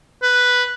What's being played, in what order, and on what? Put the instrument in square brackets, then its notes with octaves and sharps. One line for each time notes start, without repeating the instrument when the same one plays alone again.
[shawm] B4